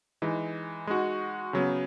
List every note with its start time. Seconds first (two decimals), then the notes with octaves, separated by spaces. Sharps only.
0.22 E3 G#3 D#4
0.87 G#3 D#4 F#4
1.53 C#3 F#3 B3